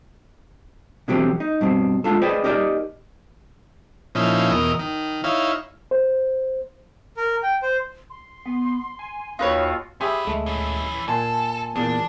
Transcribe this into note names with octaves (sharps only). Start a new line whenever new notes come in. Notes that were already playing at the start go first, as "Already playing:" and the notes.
B2 D3 E3 F#3 C4 G4
D#4
G2 B2 C4
G#3 D4 F4 A4
G#4 B4 C5 D5 D#5 G5
D#4 G4 A#4 C5 D5 D#5
A#2 F3 C#4 D#4 E4
E2 B2 A#4 D#5
D#3
D#4 E4 C#5 F5
C5
A#4
G5
C5
C6
B3
G#5
D#2 D#4 F4 F#4 B4 C#5 F5
C#4 G4 G#4 B4 E5 C6
D2 G#3 A3
E3 C#4
A#2 A4 G#5 A5 C6
E2 A#2 D4